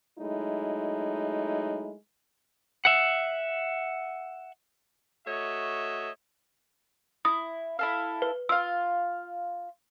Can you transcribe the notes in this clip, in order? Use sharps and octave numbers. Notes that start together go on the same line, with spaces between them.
F#3 G#3 A3 D#4 E4
E5 F#5
A3 F#4 C#5 D#5 E5
E4 D#6
E4 A4 F5
B4
F4 F5 E6